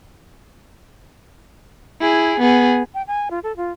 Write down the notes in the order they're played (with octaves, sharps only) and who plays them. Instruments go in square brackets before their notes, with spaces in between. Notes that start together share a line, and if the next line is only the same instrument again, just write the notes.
[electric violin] E4 G#4
B3 G#4
[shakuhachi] G5
G#5
F4
A4
F4